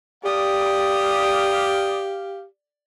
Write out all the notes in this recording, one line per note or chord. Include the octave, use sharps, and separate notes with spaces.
G4 D5 F5 D#6